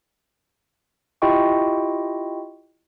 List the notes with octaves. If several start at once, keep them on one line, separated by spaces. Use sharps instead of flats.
E4 F4 G4 D#5 G5 C#6